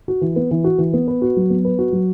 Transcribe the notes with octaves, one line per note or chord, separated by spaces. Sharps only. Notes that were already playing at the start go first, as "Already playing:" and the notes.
F#4
E3
B3
E3
F#4
E3
B3
B4
F#4
F#3
B3
B4
F#4
F#3